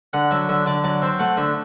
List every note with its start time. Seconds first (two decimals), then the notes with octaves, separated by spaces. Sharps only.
0.13 D3 F#5
0.31 F#3 E5
0.49 D3 E5
0.66 D3 D5
0.84 F#3 D5
1.02 C4 E5
1.19 A3 F#5
1.37 D3 E5